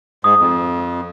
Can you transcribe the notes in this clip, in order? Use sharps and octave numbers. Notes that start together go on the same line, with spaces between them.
G#2 D#6
F2